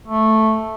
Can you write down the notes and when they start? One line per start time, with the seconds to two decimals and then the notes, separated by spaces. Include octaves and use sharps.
0.07 A3